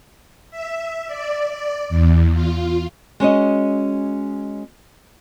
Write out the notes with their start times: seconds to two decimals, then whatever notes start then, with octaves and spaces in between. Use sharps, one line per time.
0.50 E5
1.07 D5
1.50 D5
1.89 E2
2.33 F4
3.20 G#3 C#4 F#4 D#5